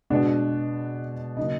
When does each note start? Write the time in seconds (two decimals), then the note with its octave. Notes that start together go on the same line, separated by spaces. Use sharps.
0.10 B2 G#3 B3 D4
1.37 C#3 F#3 A#3 D#4